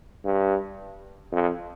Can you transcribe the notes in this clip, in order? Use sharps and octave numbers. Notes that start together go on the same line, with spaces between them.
G2
F2